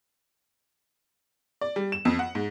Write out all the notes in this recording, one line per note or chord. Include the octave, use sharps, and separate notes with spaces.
D5
G3
E7
F2
F#5
G#2